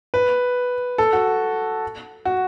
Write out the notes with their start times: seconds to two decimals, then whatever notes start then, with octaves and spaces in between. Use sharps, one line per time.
0.14 B4
0.98 A4
1.13 F#4
2.25 F#4